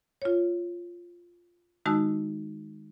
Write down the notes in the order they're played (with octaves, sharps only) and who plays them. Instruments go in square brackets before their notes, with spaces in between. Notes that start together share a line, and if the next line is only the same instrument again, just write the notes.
[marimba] F4 C#5
D#3 G#3 D#4 F#4 A5 E6